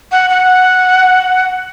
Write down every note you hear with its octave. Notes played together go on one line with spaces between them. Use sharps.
F#5
F#5